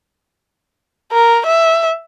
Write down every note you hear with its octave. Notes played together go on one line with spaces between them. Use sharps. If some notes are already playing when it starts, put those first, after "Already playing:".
A#4
E5